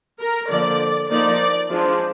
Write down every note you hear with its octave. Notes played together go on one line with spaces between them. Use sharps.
A#4
D3 F3 A#3 D5
F3 A#3 D#4 D5
F3 G#3 D4